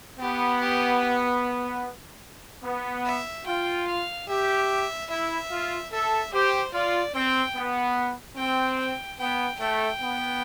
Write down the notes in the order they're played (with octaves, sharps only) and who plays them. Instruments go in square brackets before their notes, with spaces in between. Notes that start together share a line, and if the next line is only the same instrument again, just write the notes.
[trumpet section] B3 [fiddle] G4
[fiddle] G4
[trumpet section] B3
[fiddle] E5
[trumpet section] F4 [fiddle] G5
[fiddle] F5
[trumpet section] G4 [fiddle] E5
[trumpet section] E4 [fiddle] E5
[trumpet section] F4
[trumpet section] A4 [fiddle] E5
[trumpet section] G4 [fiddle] C5
[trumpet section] F4 [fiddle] D5
[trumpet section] C4 [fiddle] G5
[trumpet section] B3
[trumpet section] C4 [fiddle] G5
[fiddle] G5
[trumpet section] B3 [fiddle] G5
[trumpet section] A3 [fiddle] G5
[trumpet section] B3